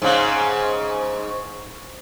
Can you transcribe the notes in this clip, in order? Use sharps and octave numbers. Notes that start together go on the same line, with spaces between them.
G#2 C#3